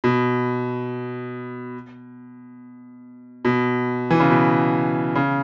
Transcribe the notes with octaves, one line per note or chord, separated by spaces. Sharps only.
B2
B2
E3
C#3
B2
C#3